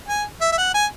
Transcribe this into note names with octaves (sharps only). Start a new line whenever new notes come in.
G#5
E5
E5
F#5
G#5